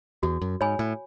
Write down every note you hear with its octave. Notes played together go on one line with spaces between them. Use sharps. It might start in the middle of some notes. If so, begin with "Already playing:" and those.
E2 F#4
F#2
G#2 C#5 G#5 B5
A2